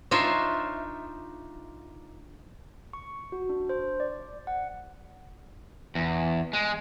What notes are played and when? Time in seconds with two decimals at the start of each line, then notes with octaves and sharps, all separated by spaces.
0.11 D4 D#4 F4 C5 C#5 E5
2.93 C#6
3.32 F#4
3.49 D4
3.69 C5
4.00 D5
4.47 F#5
5.95 E2
6.53 G#3